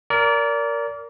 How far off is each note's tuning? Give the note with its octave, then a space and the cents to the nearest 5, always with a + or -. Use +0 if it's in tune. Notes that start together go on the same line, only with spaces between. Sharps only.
A#4 +0 D5 -30